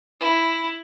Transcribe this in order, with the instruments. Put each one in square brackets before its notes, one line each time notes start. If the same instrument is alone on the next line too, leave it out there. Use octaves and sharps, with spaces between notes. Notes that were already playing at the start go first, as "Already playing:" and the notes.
[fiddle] E4